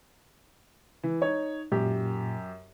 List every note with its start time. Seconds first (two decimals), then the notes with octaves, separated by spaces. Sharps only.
1.03 E3
1.22 D#4 C#5
1.72 F#2 A#2 G4